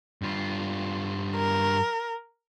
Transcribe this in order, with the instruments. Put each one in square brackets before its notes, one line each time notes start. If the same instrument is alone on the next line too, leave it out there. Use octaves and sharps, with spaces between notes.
[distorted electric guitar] G2 F4
[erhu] A#4